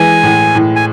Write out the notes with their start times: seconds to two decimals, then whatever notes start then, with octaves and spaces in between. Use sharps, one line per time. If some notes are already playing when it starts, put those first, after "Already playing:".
Already playing: E3 G#3 G#5
0.23 A2
0.55 A2
0.76 G#5